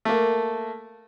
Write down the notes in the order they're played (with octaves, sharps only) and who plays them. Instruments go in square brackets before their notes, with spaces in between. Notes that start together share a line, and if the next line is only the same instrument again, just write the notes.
[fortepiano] A3 A#3